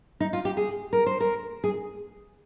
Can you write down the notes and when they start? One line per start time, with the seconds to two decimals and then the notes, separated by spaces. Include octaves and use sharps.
0.20 D#4
0.33 F4
0.45 G4
0.57 G#4
0.93 A#4
1.06 C5
1.21 A#4
1.64 G#4